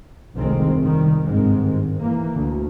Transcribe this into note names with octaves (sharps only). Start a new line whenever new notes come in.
F1 C2 G2 D#3 G#3 C4
D#3 G3
G1 G#2 D#3 G#3 C4
E3 A#3
D2